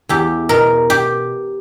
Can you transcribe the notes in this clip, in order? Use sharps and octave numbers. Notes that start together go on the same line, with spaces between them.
E2 G4
B2 A#4
G4